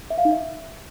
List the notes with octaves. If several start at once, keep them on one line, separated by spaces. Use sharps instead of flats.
E5
F5
D#4
E5